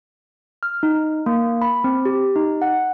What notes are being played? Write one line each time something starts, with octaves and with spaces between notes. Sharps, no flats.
F6
D#4
A#3
B5
C4
G4
D#4
F#5